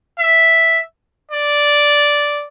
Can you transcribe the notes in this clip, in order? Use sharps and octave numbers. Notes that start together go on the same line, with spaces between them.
E5
D5